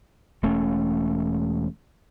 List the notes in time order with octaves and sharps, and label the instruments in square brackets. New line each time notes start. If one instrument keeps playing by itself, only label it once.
[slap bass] E1 A3 C#4